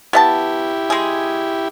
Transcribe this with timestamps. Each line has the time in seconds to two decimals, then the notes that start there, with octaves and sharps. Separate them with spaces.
0.13 B3 E4 G4 D#5 A5
0.90 G#3 G#4